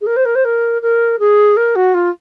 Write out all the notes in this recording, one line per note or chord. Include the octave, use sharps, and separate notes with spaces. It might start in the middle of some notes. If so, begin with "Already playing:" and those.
G#4
A#4
C5
A#4
C5
A#4
A#4
G#4
A#4
F#4
F4